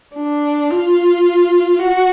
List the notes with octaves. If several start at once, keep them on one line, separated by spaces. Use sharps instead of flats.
D4
F4
F#4